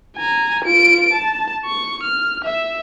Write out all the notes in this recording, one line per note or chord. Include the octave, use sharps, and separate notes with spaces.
G#5 A#5
F4 D7
A5
C#6
F6
E5